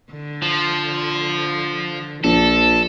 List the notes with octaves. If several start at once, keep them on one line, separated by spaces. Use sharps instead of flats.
D3
F3
A#1 F3 A4